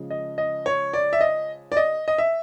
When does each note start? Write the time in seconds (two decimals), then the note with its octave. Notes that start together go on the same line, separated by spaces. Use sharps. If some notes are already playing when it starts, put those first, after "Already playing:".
Already playing: C#3 F3 G#3
0.10 D#5
0.38 D#5
0.66 C#5
0.94 D5
1.13 E5
1.21 D#5
1.72 D5
1.77 D#5
2.08 D#5
2.18 E5